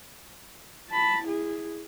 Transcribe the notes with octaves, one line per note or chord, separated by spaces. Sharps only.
A5 B5
E4 G#4